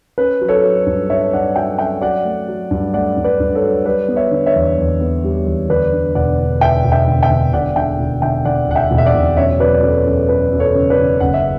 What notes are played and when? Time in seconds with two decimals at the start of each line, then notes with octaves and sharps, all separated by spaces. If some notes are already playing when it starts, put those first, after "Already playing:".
0.18 C#4 B4
0.41 F#3
0.48 A4 C#5
0.64 F#3
0.86 G2
1.10 G2 C#5 E5
1.33 G2 D5 F#5
1.56 F#3 E5 G5
1.78 C#4 E5 G5
2.01 F#3 D5 F#5
2.24 A3
2.48 F#3
2.71 G2
2.94 A3 D5 F#5
3.17 G2
3.24 B4 D5
3.40 G2
3.55 A4 C#5
3.63 F#3
3.85 G3 B4 D5
4.08 B3
4.16 C#5 E5
4.31 D3
4.46 C#5 E5
4.55 E2
4.78 E2
5.01 B3
5.24 G3
5.46 E2
5.69 D2 B4 D5
5.93 D3
6.15 E1 D5 F#5
6.39 D3
6.61 E1 E5 G5
6.84 E1
6.92 E5 G5
7.07 D2
7.23 E5 G5
7.30 D3
7.53 E1 D5 F#5
7.76 D2 E5 G5
7.99 E1
8.22 D2 E5 G5
8.45 D2 D5 F#5
8.68 E1 F#5
8.75 E5 G5
8.91 E1
8.98 E5
9.06 D5 F#5
9.14 E1
9.37 F#2 C#5 E5
9.59 F#3 B4 D5
9.74 D5
9.82 F#2 A4 C#5
10.06 F#2 A4
10.29 F#2 B4
10.52 F#2
10.59 A4 C#5
10.75 C#3
10.90 B4 D5
10.98 C#3
11.20 F#1 F#5
11.34 E5